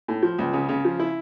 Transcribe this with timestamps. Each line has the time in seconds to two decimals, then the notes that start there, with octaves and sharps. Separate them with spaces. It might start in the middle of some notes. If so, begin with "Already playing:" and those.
0.08 A2
0.23 F3
0.38 C#2
0.53 C#3
0.69 C#3
0.85 F3
0.99 E4